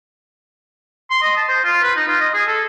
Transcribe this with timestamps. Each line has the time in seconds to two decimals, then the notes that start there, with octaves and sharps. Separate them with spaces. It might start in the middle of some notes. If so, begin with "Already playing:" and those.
1.10 C6
1.22 D#5
1.36 A5
1.48 C5
1.64 F4
1.82 B4
1.96 D#4
2.08 F4
2.20 D#5
2.34 G#4
2.47 A4